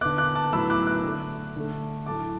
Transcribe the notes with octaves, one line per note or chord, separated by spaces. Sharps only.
D3 B3 D6 F#6
D6 F#6
A5 D6
A2 F#3 B3 B5 E6
D6 F#6
D6 F#6
D3 A3
D3 A3
A2 F#3 A3 A5 D6